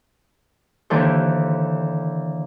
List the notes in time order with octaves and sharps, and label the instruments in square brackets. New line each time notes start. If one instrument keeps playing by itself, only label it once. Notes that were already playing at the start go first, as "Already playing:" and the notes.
[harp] D#2 D3 E3 A4 C5